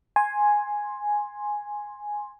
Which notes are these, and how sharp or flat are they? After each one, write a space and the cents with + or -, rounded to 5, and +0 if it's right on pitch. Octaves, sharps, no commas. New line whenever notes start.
G#5 +0 C6 +10